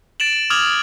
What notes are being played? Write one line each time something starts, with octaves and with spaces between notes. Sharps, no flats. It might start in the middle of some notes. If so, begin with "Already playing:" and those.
A6 D7 E7 F#7
D6 D#6 F6 G#6 F7 F#7